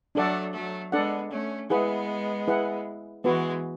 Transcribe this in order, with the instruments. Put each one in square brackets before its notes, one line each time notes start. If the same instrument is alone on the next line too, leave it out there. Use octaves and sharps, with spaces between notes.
[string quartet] F#3 A3 [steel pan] D4 A4 D5 F#5
[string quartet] F#3 A3
[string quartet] G#3 B3 [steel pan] D4 A4 D5 F#5
[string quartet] A3 C#4
[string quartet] G#3 B3 [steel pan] E4 G#4 B4 F#5
[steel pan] E4 G#4 B4 F#5
[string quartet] E3 G#3 [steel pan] B3 F#4 B4